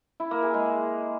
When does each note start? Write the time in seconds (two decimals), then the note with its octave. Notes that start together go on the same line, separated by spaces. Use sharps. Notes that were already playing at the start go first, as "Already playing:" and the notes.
0.20 E4
0.31 A#3
0.43 G#4
0.54 G#3